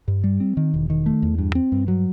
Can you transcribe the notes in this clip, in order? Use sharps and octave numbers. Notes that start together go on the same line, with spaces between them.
G2
G3
C4
D#3
E1
D#3
A3
E2
G2
C4
G2
F#3